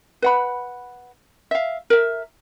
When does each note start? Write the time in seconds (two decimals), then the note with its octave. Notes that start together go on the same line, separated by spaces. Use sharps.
0.22 B4 F#5 B5
1.51 E5 F5
1.90 A#4 E5